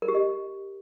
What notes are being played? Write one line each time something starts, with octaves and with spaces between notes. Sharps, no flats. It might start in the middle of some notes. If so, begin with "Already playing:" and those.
A#4
G4
D#5